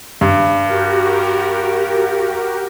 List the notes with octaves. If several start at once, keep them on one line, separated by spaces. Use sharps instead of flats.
G2
F#4 G4 A#4